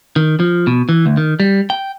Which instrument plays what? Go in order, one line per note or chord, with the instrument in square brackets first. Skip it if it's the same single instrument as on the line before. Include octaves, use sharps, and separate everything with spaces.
[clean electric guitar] D#3
F3
B2
E3
D2
D#3
G3
G5